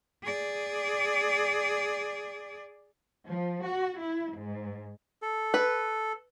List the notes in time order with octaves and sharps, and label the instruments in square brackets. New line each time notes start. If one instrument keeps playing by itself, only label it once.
[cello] G#4 D5
[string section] F3
F#4
E4
G#2
[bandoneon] A4
[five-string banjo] B4